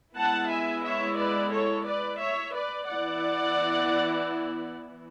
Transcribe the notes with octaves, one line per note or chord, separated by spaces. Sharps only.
G#3 B3 E4 F#5 A5
E5 G#5
C#5 E5
B4 D5
A4 C#5
B4 D5
C#5 E5
B4 D5
E3 B3 E4 D5 F#5